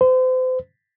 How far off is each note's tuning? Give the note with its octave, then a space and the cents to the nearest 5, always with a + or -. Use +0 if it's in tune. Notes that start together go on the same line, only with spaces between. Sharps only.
C5 -35